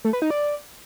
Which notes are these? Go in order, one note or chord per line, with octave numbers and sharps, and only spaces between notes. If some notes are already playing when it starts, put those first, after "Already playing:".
A3
B4
D#4
D5